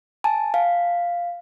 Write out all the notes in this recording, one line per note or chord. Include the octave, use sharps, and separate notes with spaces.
G#5 A5
F5